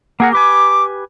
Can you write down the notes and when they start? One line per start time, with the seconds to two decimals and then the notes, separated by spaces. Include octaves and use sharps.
0.20 A#3 G#4 A#4 F#5
0.33 G4 B4 G#5 D6